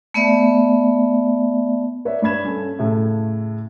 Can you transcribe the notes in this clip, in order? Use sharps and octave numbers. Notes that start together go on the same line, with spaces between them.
A3 B3 D5 E5
B4 C#5 D5 E5
G2 D4 B5 G#6 E7
C#4 A4
A2 C#3 A3